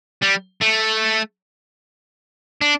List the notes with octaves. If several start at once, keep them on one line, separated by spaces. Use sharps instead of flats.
G3
A3
D4